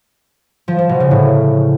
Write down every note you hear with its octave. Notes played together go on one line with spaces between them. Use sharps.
F3
F3
B2
C#3
A2